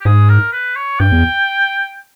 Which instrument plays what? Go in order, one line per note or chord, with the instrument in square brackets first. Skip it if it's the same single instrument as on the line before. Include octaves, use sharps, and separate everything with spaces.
[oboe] G4
[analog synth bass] G#2 [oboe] G#4
[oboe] A#4
B4
C#5
[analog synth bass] G2 [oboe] G5
[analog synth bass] E2